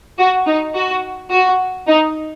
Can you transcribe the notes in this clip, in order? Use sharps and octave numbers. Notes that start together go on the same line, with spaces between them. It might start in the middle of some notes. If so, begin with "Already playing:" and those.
F#4
D#4
F#4
F#4
D#4